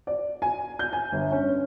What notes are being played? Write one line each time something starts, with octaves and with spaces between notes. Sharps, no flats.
D5
G#5
G6
G#5
G1
C#4